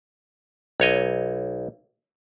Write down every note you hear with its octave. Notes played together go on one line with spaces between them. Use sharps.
B1 C#5 D#5